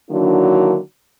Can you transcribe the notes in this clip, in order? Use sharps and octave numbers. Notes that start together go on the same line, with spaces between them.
D3 D#3 F#3 A#3 D4 E4